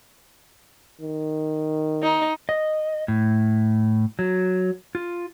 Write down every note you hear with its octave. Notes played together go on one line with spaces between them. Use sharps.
D#3
D#4
D#5
A2
F#3
F4